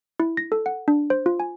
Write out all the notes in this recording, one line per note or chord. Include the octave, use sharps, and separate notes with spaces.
E4
A#6
A4
F#5
D4
C5
F4
G#5